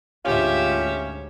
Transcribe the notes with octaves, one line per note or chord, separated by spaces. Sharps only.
D2 G#2 C#4 F4 G4 E5